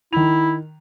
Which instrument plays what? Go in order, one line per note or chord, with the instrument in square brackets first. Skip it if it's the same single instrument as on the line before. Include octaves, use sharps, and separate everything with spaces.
[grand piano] D#3 F7 [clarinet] E4